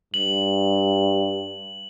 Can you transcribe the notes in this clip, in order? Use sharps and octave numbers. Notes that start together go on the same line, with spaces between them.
G2 F#7